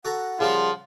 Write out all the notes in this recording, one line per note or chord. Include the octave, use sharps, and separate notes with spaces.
F#4 A4 F#5 A#5
C#3 F3 G3 F4 A#4